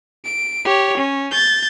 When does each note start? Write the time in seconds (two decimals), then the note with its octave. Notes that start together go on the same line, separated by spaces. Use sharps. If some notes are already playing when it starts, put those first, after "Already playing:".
0.25 D7
0.65 G4 C#5
0.97 C#4
1.31 G6 A6